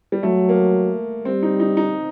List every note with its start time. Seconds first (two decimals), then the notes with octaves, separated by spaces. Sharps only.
0.12 G3
0.23 F#3 A3
0.49 A#3
1.25 G3 C4
1.43 D#4
1.60 D#4
1.77 D#4